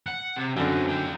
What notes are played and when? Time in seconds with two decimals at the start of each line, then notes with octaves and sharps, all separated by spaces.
0.06 F#5
0.37 C3
0.57 F#2 D3 C4 F#4
0.88 A#3 G5